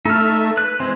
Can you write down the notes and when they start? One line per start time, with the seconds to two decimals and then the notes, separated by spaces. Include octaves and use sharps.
0.05 A3 D#4 E5 F6
0.57 B4 F#6
0.80 E3 G#3 C4